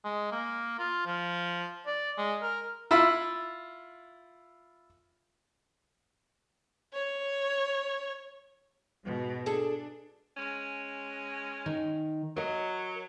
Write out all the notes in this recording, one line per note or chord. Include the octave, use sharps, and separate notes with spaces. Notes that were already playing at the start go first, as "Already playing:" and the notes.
G#3
A#3
F4
F3
D5
G#3
A#4
E4 F4 B5 E6
C#5
G#2 B2
D4 G#4 A4
G#3 C#4
D#3
F#3 A#4 D#5